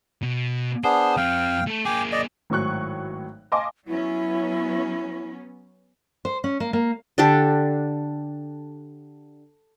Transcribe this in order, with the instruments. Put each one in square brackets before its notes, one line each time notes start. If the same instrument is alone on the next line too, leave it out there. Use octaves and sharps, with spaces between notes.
[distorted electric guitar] B2
[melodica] B3 D4 G#4 [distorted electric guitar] C5
[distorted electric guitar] F2 C4 [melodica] F5 G5
[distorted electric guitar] A3 A4
[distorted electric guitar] A#3 G#4 [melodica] G5 G#5 D6
[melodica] D5 D#5
[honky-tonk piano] G#1 A2 F#3 C#6 F#6
D#5 F5 G#5 A5 C6 D6
[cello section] F#3 B3 C#4 [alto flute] E4
[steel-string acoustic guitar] C5
C#4
A#3
A#3
[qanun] D3 D4 G4 A4